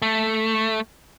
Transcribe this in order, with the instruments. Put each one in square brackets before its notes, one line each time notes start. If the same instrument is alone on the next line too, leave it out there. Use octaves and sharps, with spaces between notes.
[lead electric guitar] A3